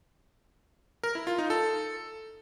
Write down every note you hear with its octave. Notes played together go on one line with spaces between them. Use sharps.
A#4
E4
F4
D#4
A4